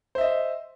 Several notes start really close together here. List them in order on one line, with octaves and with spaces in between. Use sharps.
C5 E5 D#5